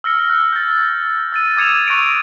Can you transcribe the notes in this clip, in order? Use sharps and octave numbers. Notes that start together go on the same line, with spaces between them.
E6 F6 A#6 C#7
F#6
G6 A6
E6 A6 D#7
D6 D#6 G#6 C#7 E7 F7
C#6 F#6 A#6 D7 D#7